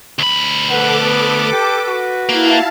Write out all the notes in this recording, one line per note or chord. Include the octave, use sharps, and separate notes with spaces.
D2 B5
A4 B4 F#5 D6
B3
G4
F#4
A#3 E4 F5 A5